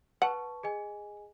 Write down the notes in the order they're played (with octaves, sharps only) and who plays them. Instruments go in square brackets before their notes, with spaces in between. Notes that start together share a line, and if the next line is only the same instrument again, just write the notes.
[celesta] B4 A5 C#6 [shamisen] F#5
[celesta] G#4 D#5 G#5